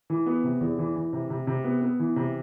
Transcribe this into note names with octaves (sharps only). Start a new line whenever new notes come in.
E3
B3
C3
E2
E3
E3
C3
C3
C3
B3
B3
E3
C3